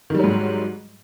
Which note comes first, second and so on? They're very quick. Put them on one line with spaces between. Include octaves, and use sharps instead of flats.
D#3 G3 F#3 G#2